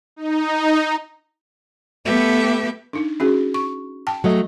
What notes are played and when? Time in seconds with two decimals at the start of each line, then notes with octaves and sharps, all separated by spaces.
0.16 D#4
2.05 A3 B3 G4 A4 B4 E5
2.93 D4 D#4
3.20 C#4 F#4 G#4
3.54 C#6
4.07 G5 A5
4.24 F#3 A3 D#5